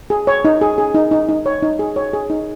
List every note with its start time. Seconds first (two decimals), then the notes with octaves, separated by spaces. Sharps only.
0.10 G#4
0.27 C#5
0.45 D#4
0.61 G#4
0.78 G#4
0.95 D#4
1.11 D#4
1.29 D#4
1.46 C#5
1.63 D#4
1.79 G#4
1.96 C#5
2.13 G#4
2.30 D#4